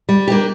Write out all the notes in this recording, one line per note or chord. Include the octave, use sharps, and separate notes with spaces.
G3
A#3 D4 G4